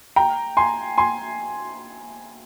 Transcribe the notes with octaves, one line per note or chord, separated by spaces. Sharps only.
G5 A#5
G#5 C6
G#5 C6